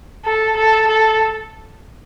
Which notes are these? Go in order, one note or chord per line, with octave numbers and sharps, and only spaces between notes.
A4
A4
A4